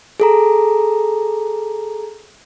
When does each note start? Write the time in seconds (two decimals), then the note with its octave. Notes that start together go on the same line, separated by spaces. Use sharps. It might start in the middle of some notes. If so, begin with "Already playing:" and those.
0.20 G#4 A4 A#5